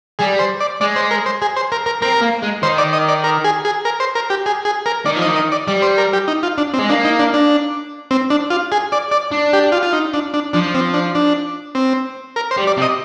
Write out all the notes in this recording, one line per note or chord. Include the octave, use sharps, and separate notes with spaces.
G3 G#4
C5
D5
G#3 D5
C5
A#4
C5
G#4
C5
A#4
A#4
C4 A#4
A#3
G#3
D#3 C5
D5
D#5
D5
A#4
G#4
G#4
A#4
C5
A#4
G4
G#4
G#4
A#4
D#3 D5
F3
D#5
D#3
D#5
D5
G3 D5
C5
A#4
G4
D#4
F4
D4
C4
G#3
A#3 D4
D#4
D4
D4
C4
D4
F4
G#4
D5
D5
D4
G4
F4
F4
D#4
D4
D4
F3 D4
C4
D4
D4
C4
A#4
C5
G3
D5
C3
D#5